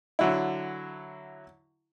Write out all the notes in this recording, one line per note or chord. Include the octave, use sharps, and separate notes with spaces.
D3 F#3 E4